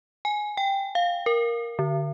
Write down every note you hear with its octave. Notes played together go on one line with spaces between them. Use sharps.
G#5
G5
F5
A#4
D3